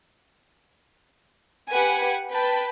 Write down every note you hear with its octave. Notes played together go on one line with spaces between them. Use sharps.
G4 B4 F#5 G#5
B4 G5 A5 B5